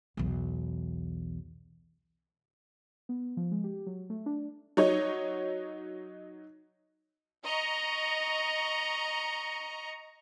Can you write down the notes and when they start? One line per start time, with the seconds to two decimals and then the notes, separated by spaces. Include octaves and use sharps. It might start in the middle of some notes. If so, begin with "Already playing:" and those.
0.17 B1 E2
3.09 B3
3.37 F3
3.52 G#3
3.64 G4
3.86 F#3
4.10 A3
4.26 D4
4.77 F#3 D#4 C#5 D#5
7.45 D#5 A#5 C#6